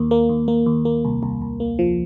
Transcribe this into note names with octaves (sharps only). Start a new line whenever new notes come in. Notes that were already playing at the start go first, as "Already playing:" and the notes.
Already playing: D#2 A#3
A#3
D#2
A#3
D#2
A#3
C2
C2
C2
A#3
F3